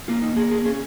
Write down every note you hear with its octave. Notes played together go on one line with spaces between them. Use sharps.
A#3 F4
D#4
A#3 G#4
G#4
C#4 G#4